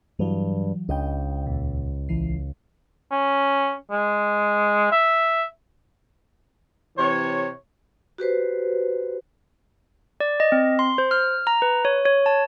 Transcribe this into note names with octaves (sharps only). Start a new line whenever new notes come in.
G2 E3 F#3
C#2 D4 D#5 G5
D#2 A#2
A#1 E3 C7
C#4
G#3
E5
C3 E3 C#5
F#4 G4 B4 C5
D5
D#5
C4
C6
C5
F6
A#5
B4
C#5
C#5
A5